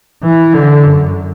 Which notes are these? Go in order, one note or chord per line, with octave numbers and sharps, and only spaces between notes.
E3
D3
F#2